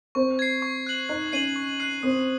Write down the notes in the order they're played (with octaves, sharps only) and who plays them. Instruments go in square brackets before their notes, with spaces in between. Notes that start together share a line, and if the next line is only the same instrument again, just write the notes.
[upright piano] C4 C5 [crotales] C#6
[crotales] G#6 C7
C#6
F#6 C7 F#7
[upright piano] D#4 D#5 [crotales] F#6
[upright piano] C#4 C#5 [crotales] C7 D#7 F#7
[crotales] C#6
F#6 C7
[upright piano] C4 C5 [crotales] D#6